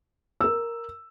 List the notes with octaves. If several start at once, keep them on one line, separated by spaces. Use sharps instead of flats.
A#4 E6